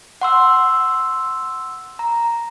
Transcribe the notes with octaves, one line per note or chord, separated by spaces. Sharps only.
F#5 C6 E6
A#5